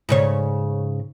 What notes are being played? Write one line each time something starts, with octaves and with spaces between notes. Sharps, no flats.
G#2 C#3 C#5